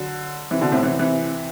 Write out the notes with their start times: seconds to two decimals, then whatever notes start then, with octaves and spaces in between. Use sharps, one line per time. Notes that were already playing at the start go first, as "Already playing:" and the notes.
Already playing: D3 F#3
0.51 C3 E3
0.61 B2 D3
0.71 A2 C3
0.83 C3 E3
0.99 C3 E3